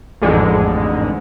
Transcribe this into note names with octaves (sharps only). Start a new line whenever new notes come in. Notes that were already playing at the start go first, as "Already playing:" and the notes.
A1 F2 G#2 D3 G#3